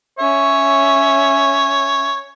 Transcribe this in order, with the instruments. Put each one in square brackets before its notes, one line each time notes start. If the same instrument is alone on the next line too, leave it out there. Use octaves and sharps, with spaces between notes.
[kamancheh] C#4 E5 [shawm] C#5